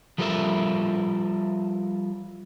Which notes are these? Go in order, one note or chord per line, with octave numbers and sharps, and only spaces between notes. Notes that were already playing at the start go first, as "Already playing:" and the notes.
F3 G3 F4 A4 A#4 E5